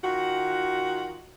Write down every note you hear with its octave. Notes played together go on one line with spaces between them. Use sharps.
D#3 F4 F#4